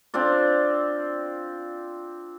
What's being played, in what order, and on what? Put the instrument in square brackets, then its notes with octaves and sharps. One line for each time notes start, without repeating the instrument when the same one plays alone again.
[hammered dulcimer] C4 D4 F4 D5